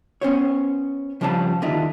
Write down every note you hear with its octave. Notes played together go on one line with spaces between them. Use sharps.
B3 C#4 C5 C#5
C#3 F3 G3 D4 C5 A5
D#2 D3 D4 D#4 F4 E5